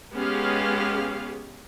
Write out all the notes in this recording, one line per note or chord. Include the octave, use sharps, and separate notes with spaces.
G#3 B3 C#4 G4 G#4 F5